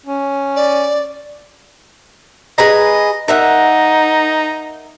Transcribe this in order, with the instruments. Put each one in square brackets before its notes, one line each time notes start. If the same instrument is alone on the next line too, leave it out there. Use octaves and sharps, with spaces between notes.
[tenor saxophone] C#4
[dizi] D5
[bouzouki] G#4 B4 A#5 [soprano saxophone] D#5
[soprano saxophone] D#4 [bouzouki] A#4 E5 F#5